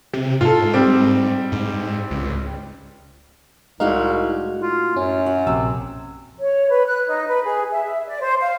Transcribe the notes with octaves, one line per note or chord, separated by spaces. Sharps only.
C3
G#2 F4 A4
G3 C4
G#2
C#2
C2 A2 G#3 D#4 F#4 F5
F4
F#2 C#4
F#4
A#1 C3 E6
C#5
B4
F#6
D#4
B4
G#4
E5
D5
C5
F5